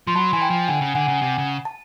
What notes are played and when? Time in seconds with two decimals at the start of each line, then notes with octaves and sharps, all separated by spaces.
0.07 F3 C6
0.15 F#3 A5 B5
0.33 E3 G#5
0.42 G5 A5
0.50 F3
0.68 D3 F#5 G#5
0.81 C#3
0.95 D3 F#5 G#5
1.08 C#3
1.22 C3
1.38 C#3
1.65 A5